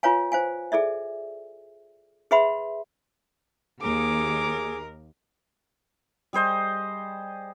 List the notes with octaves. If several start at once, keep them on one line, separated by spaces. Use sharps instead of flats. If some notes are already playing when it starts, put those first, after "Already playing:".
F4 B4 C#5 F5 G#5
C5 F5 G#5
G#4 A4 D5 E5
G#4 B4 E5 F#5 B5 C6
D#2 G#4 A#4 D6
G3 G#4 C5 D#5